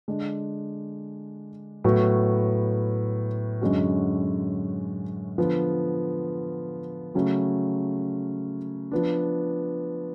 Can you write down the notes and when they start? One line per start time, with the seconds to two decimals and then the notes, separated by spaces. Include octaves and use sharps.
0.08 D3 G#3 D4
1.84 A2 F#3 B3 F#4
3.61 F#2 D3 G#3 C#4 F#4
5.38 D3 F3 B3
7.15 C#3 F#3 A3
8.92 F3 B3 D4